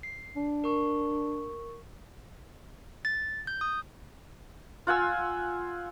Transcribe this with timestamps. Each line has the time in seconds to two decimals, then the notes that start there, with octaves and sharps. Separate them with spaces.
0.03 C7
0.36 D4
0.64 A#4 C#6
3.05 A6
3.47 G6
3.61 D#6
4.87 F4 F#5 G#5 E6